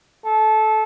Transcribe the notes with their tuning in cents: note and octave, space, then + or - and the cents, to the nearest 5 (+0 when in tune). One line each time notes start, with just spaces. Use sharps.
A4 -20